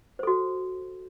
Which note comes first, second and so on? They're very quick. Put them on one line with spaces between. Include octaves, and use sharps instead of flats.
C5 A4 F#4